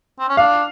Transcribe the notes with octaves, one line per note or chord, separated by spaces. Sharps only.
C4
C#4
D4 F5